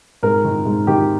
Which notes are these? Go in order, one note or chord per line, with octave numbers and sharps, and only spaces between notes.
G#2 A#4
D#3
G#2
D#3 G4